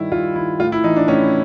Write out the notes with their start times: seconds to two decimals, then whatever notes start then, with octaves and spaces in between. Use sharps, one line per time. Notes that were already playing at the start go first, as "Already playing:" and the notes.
Already playing: G2 D#3 E4
0.11 G2 F4
0.36 D#3 E4
0.59 A2 F4
0.72 E4
0.84 E3 D#4
0.96 D4
1.08 A2 C#4